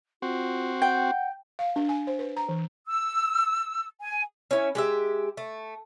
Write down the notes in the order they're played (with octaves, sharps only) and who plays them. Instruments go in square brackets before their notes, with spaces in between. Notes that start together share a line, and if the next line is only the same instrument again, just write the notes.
[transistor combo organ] C4 F#4 [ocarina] F4
[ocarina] F#5 [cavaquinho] G5
[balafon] F5
D4
G#5
C5
B4
A#5
E3
[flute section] E6
G#5
[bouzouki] C#4 E4
G#3 G4 E5
A3